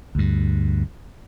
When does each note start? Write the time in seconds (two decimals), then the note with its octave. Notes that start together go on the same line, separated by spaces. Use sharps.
0.15 D2 G2